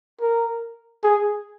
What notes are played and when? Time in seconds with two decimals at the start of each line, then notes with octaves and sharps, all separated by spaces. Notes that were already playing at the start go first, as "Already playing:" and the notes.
0.21 A#4
1.04 G#4